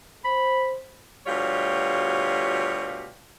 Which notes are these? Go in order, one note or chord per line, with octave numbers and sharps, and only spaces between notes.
C5 B5
D2 B2 G3 F4 G4 C#5